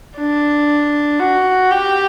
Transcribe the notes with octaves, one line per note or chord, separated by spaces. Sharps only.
D4
F#4
G4